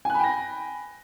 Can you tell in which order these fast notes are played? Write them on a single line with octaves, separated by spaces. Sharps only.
G#5 F#6 B5 G5 A#6